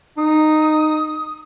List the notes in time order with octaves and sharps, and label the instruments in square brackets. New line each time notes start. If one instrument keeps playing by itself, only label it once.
[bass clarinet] D#4 [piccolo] D#6